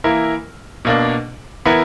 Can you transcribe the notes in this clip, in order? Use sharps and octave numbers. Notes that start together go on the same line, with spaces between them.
E3 A#3 E4 A#4
B2 A#3 D4
E3 B3 E4 A#4